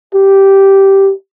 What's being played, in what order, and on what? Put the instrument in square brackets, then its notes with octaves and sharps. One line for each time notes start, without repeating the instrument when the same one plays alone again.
[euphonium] G4